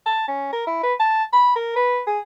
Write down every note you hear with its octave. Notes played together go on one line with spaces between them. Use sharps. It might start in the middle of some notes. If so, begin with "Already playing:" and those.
A5
C#4
A#4
E4
B4
A5
B5
A#4
B4
G#4